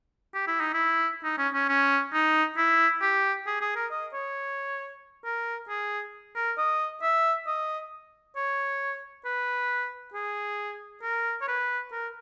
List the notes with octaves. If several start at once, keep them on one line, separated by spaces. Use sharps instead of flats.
G4
E4
D#4
E4
D#4
C#4
C#4
C#4
D#4
E4
G4
G#4
G#4
A#4
D#5
C#5
A#4
G#4
A#4
D#5
E5
D#5
C#5
B4
G#4
A#4
C#5
B4
A#4